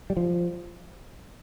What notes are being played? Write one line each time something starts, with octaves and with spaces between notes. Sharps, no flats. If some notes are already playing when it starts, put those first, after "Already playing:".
G3
F3